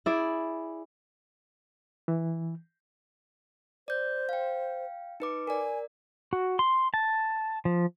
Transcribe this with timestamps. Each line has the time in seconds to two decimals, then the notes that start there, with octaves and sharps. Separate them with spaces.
0.06 E4 G#4 D5
2.08 E3
3.88 C5 D5 G6
4.29 F5 G5
5.20 D#4 B4 D6
5.47 A#4 D5 G#5
6.33 F#4
6.59 C6
6.94 A5
7.65 F3